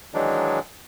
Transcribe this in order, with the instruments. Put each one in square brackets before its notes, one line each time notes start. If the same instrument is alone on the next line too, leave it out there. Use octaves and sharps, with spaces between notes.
[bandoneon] D#3 E3 F#3 G#3 D4 D#4